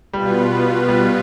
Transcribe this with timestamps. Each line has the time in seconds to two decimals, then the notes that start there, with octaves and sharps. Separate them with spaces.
0.13 B2 G3 B3 F4 B4
0.88 G3